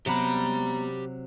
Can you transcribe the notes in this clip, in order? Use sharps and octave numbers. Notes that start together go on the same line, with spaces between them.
C3 F#3 B3 G4 A#5 B5